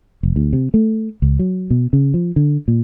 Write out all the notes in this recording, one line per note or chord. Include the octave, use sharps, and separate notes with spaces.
F1
D2
C3
A3
C#2
F#3
B2
C#3
F3
D3
A#2